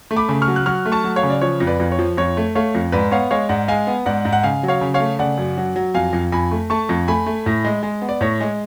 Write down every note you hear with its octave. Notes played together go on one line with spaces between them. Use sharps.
A3
B5 D6
C#3
C#6 F6
F#3
F#6
F#3 C#6 F6
A3
A5 C#6
F#3
C#5 F5
C#3
D5
F3 C#5
F2
B4 D5
F2
C#5
F3
F2 C#5
A3
A3 C#5 F5
F2
G#2 B4 D5
B3 C#5 F5
G#3 C#5 F5
G#2 D5 F#5
G#3 F5 G#5
B3
G#2 D5 F#5
G#2
F#5
C#3 F5 G#5
F#3
C#5 F5
C#3
C#5 F5
A3
C#3 D5 F#5
F#2
F#3
F#3
F2 F5 G#5
F2
F2 G#5 B5
A3
A3 A5 C#6
F2
A3 G#5 B5
A3
A2
G#3
G#3
B3
D5
A2 C#5
G#3